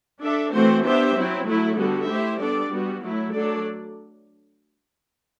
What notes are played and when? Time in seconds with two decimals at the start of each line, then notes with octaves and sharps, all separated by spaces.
0.21 D4 A4 E5
0.52 E3 A3 C4 F#4 C5
0.84 B3 D4 G4 C5 E5
1.15 F#3 C4 E4
1.47 F#3 A3 E4
1.77 D3 G3 B3 F#4 A4
2.09 A3 E4 G4 C5 E5
2.40 G3 B3 D4 A4 D5
2.72 G3 B3 F#4
3.03 F#3 A3 E4
3.34 F#3 A3 D4 A4 D5